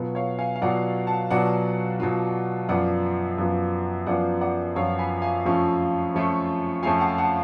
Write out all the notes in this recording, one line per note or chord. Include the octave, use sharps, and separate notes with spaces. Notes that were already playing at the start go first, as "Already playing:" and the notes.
Already playing: B2 F#3 B3 F4
C#5 F5
F5 G#5
F5
B2 F#3 B3 F4 D5 F#5
F#5 A5
B2 F#3 B3 F4 D5 F#5
B2 F#3 B3 F4
F#2 F3 B3 F4 D5 F#5
F#2 F3 B3 F4
F#2 F3 B3 F4 D5 F#5
D5 F#5
F#2 F3 B3 F4 C#5 F5
G#5 B5
F5 G#5
F2 F3 A3 C#4 F4
F2 F3 A3 C#4 F4
F2 F3 A3 C#4 F4 F5 G#5
F#5 A5
F#5 A5